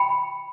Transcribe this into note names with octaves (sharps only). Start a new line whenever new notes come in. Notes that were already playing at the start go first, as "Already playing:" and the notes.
Already playing: G5 B5